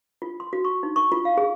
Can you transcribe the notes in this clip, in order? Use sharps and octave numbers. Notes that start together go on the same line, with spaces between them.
F4
C6
F#4
C#6
D#4
C#6
F4
F5
G#4